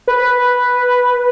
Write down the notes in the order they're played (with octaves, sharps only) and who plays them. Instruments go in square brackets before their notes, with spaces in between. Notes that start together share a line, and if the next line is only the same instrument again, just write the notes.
[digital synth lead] B4